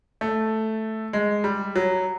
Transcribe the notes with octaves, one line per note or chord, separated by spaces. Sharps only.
A3
G#3
G3
F#3